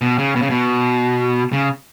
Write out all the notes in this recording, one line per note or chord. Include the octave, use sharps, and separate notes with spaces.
B2
C#3
B2
C#3
B2
C#3